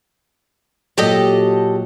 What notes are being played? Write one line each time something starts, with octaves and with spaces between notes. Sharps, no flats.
A#2 F#3 G4 A4 D#5